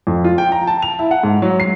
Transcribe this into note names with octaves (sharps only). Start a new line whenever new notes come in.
F2
F4
G5
A#5
A5
F7
E4
F#5
G#2
F#3
C7